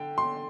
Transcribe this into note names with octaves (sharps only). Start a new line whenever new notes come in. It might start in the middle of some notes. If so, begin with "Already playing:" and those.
Already playing: D3 G5
C6